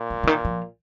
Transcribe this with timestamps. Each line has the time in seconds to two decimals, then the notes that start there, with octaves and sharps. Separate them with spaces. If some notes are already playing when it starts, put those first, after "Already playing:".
Already playing: A#2
0.10 F3
0.23 C#3
0.27 D#3
0.45 F3